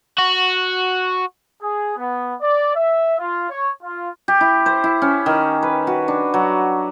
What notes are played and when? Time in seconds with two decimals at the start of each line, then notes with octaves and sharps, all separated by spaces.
0.18 F#4
1.61 G#4
1.97 B3
2.41 D5
2.75 E5
3.19 F4
3.50 C#5
3.82 F4
4.28 G4
4.41 E4
4.66 C5
4.84 E4
5.02 C#4
5.26 D#3
5.63 B4
5.87 F#4
6.08 D4
6.34 F#3